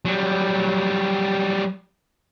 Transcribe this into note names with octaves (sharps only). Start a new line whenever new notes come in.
F#3 G3